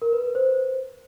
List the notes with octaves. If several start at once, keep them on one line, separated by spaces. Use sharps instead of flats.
A#4
B4
B4
C5